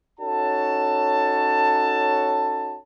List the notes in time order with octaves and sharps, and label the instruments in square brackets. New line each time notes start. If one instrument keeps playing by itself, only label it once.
[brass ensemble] C#4 D#4 F#4 A4 C#5 A5